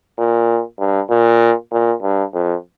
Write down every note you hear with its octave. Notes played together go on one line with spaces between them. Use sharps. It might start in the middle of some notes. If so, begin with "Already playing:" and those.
A#2
G2
A#2
A#2
G2
F2